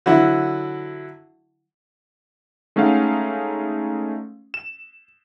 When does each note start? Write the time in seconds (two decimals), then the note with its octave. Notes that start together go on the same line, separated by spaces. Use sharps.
0.06 D3 F#3 E4
2.76 G#3 A3 C#4 D#4 F5 F#5
4.54 E7